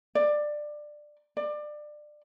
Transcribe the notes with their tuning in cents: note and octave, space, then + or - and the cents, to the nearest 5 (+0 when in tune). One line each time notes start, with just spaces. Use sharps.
D5 +15
D5 +25